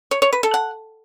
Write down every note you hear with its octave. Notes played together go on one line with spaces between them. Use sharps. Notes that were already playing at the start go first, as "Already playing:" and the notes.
C#5
C#5
B4
A4
F#5